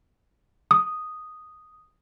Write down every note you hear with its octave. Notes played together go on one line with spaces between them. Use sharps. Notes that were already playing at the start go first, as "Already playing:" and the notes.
D#6